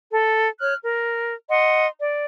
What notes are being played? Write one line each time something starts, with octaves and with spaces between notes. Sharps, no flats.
A4
C#5 F6 F#6
A#4
D#5 F#5 C6
D5